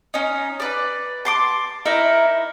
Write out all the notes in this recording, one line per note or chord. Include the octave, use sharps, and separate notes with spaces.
C#4 D#4
B4 D5
A5 C6 D6
D#4 E4 A#4 E5